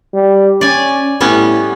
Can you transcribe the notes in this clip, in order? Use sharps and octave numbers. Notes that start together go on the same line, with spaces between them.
G3
C#4 D5 G#5
A2 G3 B3 C#4